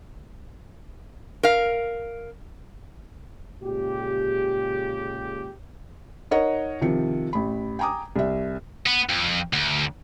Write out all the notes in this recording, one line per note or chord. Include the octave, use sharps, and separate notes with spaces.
A#4 F5
A#2 C#3 G#3 G4
D#4 A#4 C#5 D#5 F#5 A#5
C3 D#3 F3 C#7
A1 B5
G5 G#5 A#5 D6 D#6
C2 E5
B3
F2
D2